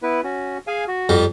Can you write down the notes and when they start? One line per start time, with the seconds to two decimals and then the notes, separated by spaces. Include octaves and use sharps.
0.03 B3 E4 B4
0.24 C#4 F#4
0.67 G#4 F5 G#5
0.88 F#4
1.09 F2 G3